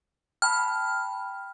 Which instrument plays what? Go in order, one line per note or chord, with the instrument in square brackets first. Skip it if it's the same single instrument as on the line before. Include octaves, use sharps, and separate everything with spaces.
[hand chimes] G5 A5 B5 [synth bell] F6